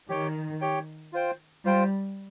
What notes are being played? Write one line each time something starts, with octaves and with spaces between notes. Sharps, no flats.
D#3 G4 C#5 G5
G4 C#5 G5
F4 C5 G5
G3 F4 C5 G5